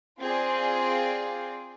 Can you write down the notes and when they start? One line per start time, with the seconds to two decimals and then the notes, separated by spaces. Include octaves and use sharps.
0.21 C4 F4 G#4 D5